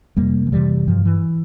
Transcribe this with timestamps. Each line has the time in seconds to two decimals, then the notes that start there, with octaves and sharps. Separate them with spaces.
0.17 F2 C3 G3 A#3
0.47 F3
0.52 F2 C3 E3 G3
0.87 G2 F3
1.05 E3